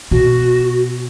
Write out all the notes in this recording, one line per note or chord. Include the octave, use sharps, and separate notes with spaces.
B2 F#4